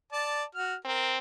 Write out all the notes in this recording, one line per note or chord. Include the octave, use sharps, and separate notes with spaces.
D5 A5
F#4 F6
C4 A#4